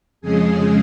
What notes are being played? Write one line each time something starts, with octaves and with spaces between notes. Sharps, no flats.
F2 C#3 G#3 G#4